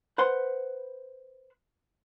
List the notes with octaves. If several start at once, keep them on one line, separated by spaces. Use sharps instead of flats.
B4 C5 F#5 C6